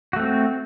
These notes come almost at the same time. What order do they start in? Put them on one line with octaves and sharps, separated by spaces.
F#4 A3 C4